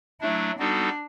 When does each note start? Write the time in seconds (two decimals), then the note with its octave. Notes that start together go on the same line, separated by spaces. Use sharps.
0.21 F#3 A3 D4 E4
0.59 G3 B3 D4 D#4 F#4 A4